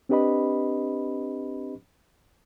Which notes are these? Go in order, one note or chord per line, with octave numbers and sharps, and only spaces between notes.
C4 D4 G4 B4 D#5 B5